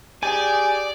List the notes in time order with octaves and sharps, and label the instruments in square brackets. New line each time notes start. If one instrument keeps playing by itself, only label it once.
[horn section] G4 G#4 [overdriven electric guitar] D5 [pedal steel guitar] G#5